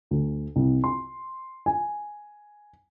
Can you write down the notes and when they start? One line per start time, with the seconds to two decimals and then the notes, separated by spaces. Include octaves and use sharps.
0.11 D2
0.56 C2
0.84 C6
1.66 G#5